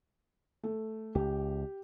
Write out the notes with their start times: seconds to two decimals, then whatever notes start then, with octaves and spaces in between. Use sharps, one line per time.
0.63 A3
1.15 C#2 G4